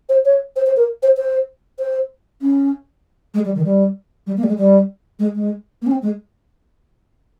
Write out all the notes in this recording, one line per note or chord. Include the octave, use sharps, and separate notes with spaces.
C5
C#5
C5
C5
A#4
C5
C5
C5
C#4
G#3
G3
D#3
G3
G3
A#3
G3
G#3
G3
G#3
G#3
A#3
C#4
C4
G#3